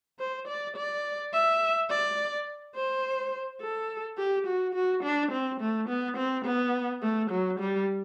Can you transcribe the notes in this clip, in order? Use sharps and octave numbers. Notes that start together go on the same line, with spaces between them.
C5
D5
D5
E5
D5
C5
A4
G4
F#4
F#4
D4
C4
A3
B3
C4
B3
A3
F#3
G3